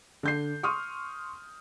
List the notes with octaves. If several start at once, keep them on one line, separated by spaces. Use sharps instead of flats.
D3 G6 C7
C6 C#6 D#6 F6